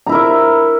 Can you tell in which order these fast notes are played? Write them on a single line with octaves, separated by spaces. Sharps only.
A#5 E4 A#4 E5